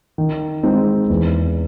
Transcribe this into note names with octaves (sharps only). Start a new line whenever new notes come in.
D#3
G#3 C4 D#4
E2